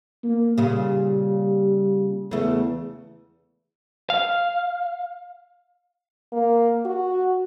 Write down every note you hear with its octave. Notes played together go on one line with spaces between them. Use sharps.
A#3
A#2 C#3 G3
E2 C#3 A3
F5
A#3
F#4